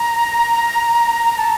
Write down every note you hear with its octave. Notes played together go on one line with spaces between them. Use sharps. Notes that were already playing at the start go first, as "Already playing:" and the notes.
Already playing: A#5
A5